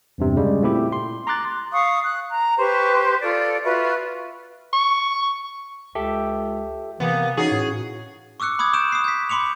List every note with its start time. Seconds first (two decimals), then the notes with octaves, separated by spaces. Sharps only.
0.18 E2 G2 C3
0.37 C#3 G3 G#3
0.62 A#2 A3 C4 E4 G4
0.92 C6
1.27 A#5 C6 D6 F#6 A6
1.72 F5 C#6 D#6
2.04 F#6
2.31 A#5
2.58 G4 B4 C5 C#6
3.22 F4 A4 D5
3.64 F4 F#4 B4 E5
4.73 C#6
5.95 C#2 G4 A4 E5
7.00 C3 E3 A#3 B3
7.37 C#4 D#4 F#4 G#4 C#6
7.51 A2
8.40 C#6 D6 E6 F#6 C#7
8.59 B5 D6 D#6 G#6
8.73 C#6 D#6 F#6 G6 D7 E7
8.92 D#6 C7
9.04 G6 B6
9.29 B5 C6 D6 C#7 F7